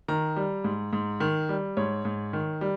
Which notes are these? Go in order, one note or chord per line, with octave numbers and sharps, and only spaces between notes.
D#3 A#5
G3
G#2
G#2
D#3
G3
G#2 C#5
G#2
D#3
G3